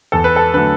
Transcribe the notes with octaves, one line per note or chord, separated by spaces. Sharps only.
E2 A4
B4
A4
D3 F#3 A3 B4